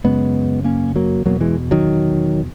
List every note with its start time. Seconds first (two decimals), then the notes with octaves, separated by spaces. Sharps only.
0.04 F#2 C#3 G#3 B3
0.64 A#3 C#4
0.96 F#3 A#3
1.25 E2 B2 F#3 A#3
1.41 E3 G#3
1.71 D#3 F#3